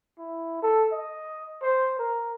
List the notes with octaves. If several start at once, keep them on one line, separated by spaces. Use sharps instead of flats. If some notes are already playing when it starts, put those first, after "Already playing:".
E4
A4
D#5
C5
A#4